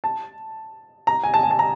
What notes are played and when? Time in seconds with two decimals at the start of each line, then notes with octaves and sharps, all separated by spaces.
0.04 A5
1.07 A#5
1.24 G#5
1.34 A5
1.43 G#5
1.51 A5
1.59 A#5